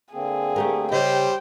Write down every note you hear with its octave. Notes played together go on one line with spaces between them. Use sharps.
D3 A#3 C4 G#4
A3 G4 A#4
C#3 G3 G4 C5 D#5 G5